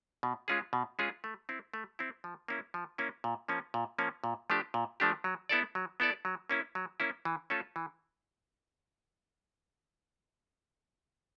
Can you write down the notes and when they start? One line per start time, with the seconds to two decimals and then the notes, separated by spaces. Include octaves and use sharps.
0.23 B2
0.48 G#3 C#4 F4 G#4
0.73 B2
0.99 G#3 C#4 F4 G#4
1.24 A3
1.49 C4 E4
1.74 A3
1.99 C4 E4
2.24 F3
2.48 A#3 C#4 E4
2.74 F3
2.98 A#3 C#4 E4
3.24 A#2
3.48 F3 A#3 C#4
3.74 A#2
3.98 F3 A#3 C#4
4.24 A#2
4.50 F3 A3 D4 G4
4.74 A#2
5.00 F3 A3 D4 G4
5.24 F#3
5.49 B3 E4 A4 D5
5.75 F#3
6.00 B3 E4 A4 D5
6.25 F#3
6.50 A#3 C#4 E4
6.75 F#3
7.00 A#3 C#4 E4
7.25 E3
7.50 A3 C#4 F4 A4
7.76 E3